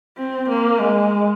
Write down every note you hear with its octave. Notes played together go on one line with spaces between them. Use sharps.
C4
A#3
G#3